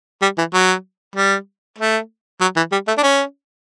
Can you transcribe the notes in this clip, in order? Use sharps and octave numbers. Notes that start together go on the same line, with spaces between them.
G3
E3
F#3
G3
A3
F#3
E3
G3
A3
D4
C#4